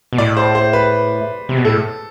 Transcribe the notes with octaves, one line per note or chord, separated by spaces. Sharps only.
B2
A2 D5
C5
C5
B4
C3
B2
A2 A4